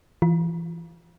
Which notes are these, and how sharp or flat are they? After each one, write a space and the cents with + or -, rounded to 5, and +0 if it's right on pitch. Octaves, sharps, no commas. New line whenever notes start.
E3 +25 F4 +5